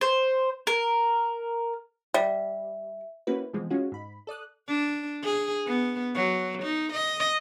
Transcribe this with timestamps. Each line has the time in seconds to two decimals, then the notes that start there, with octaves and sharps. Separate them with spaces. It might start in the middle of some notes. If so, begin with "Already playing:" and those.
0.01 C5
0.67 A#4
2.14 G3 E5
3.27 A#3 C4 C#4 E4 F#4 B4
3.53 B2 E3 F3 G#3 C4
3.70 G#3 C#4 F4 F#4
3.92 G#2 B5
4.27 A4 D5 D#6 F#6
4.68 D4
5.23 G#4
5.66 B3
6.15 F#3
6.63 D#4
6.93 D#5